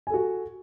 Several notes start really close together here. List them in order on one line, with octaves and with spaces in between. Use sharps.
G#5 A4 F#4